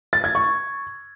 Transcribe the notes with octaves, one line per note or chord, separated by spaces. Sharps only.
A6
G#6
C#6